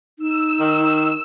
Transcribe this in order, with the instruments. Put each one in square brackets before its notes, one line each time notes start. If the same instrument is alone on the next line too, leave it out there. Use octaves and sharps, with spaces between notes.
[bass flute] D#4 [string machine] E6
[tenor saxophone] D#3